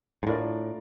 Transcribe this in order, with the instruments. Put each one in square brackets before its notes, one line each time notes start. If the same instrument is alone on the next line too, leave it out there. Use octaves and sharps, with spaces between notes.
[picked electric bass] G#2
[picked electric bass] A2 [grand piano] A3 D4 F4 A#4 D5